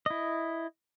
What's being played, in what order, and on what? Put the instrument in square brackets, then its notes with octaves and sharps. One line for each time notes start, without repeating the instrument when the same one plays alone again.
[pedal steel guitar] E4 D#5